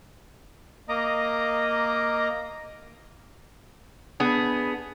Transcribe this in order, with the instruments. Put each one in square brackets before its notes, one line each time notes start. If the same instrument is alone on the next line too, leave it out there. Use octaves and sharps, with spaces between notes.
[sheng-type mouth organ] A#3 D#5 A#5 D6 D#6
[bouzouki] B3 G#4 [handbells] D4 B5